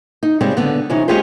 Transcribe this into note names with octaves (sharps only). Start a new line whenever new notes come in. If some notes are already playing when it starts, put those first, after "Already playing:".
D#4
C#3 G3 G#3 C4
D3 B3
C3 E3 C#4 D#4
G#3 C#4 F4 G4 G#4 C5